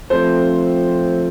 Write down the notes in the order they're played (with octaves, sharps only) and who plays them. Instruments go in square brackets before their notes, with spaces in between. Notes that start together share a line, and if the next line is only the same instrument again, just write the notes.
[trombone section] F3 A3 C4 [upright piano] A4 C5